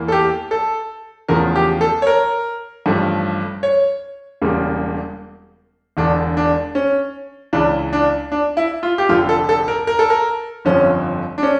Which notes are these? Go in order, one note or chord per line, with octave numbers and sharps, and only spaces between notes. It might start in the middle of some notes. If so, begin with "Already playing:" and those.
Already playing: E2 E3 A#3
A4
G4
A4
E2 C#3 F3 A3 A#4
G4
A4
C#5
A#4
A1 G2 F3 A3
C#5
E1 E2 C#3 G3 A#3
E1 E2 D3 D4
D4
C#4
C#2 C#3 E3 D4
D4
D4
E4
F4
G4
F1 F2 D3 F4
A4
A4
A#4
A#4
A4
A#4
G1 F2 D3 F3 C#4
D4
C#4